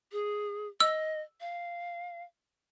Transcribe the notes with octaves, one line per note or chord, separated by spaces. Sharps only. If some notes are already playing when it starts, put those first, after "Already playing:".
G#4
D#5 E6
F5